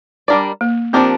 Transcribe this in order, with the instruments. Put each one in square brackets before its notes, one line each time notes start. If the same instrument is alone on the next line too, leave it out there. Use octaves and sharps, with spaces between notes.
[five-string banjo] G3 D4 A#4 D5
[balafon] A#3
[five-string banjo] F3 D4 G4 A#4 [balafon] C4